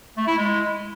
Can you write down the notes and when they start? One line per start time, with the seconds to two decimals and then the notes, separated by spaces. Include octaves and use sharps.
0.17 A3
0.28 E4
0.38 G#3